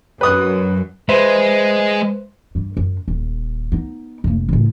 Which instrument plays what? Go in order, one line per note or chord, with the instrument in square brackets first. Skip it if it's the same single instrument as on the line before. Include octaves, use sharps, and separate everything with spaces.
[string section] F#2 [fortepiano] B4 D#6 F#6
[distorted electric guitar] G#3 [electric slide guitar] B4 C5 E5
[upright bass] G2 G3
F#2
D#1
B3 D#4
F1 A#3
A2 C#3